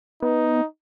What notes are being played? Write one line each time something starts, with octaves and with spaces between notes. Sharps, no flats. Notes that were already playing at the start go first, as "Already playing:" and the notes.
B3 D#4